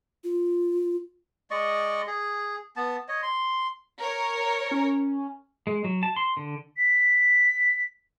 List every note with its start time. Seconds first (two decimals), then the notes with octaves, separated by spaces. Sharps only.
0.24 F4
1.51 G#3 D5 D#5 C#6
2.07 G#4
2.76 B3 A5
3.08 C#5 D#5
3.23 C6
3.99 A#4 C#5
4.71 C#4
5.67 G#3
5.84 F#3
6.03 A5
6.16 C6
6.37 D3
6.77 B6